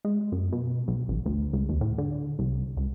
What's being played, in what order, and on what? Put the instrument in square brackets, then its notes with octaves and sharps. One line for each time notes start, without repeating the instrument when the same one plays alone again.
[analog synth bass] G#3
F#2
B2
B1
A1
D2
C#2
D#2
A2
D3
C2
C#2